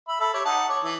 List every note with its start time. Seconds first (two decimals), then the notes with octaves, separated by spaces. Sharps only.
0.08 E5 B5
0.20 A4 E5 B5
0.34 G4 C#5 E5
0.45 D#4 F#5 A5
0.68 C#5 D6
0.84 E3